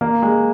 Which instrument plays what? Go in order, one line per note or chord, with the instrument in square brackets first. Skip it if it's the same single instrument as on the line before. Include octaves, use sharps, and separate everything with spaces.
[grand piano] A#3
G#3